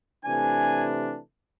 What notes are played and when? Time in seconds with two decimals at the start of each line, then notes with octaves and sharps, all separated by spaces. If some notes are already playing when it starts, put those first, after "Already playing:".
0.24 C3 E3 A3 D4 G#5